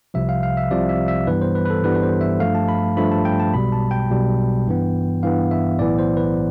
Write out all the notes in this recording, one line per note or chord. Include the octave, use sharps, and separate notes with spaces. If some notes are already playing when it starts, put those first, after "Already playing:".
C2 C3 F3 E5
F5
F5
E5
C2 C3 F3 D5
E5
E5
G2 E3 G3 B3 B4
C5
B4
B4
A4
G2 E3 G3 B3 B4
B4
C5
E5
G2 F3 A3 F5
A5
B5
G2 F3 A3 B5
A5
G5
A5
B1 B2 G3 B5
A5
G5
B1 B2 G3
G2 E3 B3
G2 E3 B3 F5
E5
B1 A2 E3 B3 D5
C5
B4